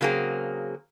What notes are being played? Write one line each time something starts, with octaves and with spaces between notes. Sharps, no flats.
C#3 F#3 A#3 C4 G#4